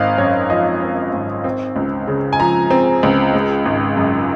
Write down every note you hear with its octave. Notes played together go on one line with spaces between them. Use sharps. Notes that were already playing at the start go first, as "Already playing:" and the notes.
Already playing: G#1 C4 D#5 F5
F#2 C#5
F3 D#5
C4
G#1
C4
C#2
C#3
G#5
F3 A#5
C4
C#2
G#3
G#1
F#2